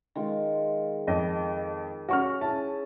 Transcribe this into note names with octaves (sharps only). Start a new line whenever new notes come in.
D#3 G#3 F4
F2 D#5
C#4 F#4 C#6 F6
E4 G#4 A5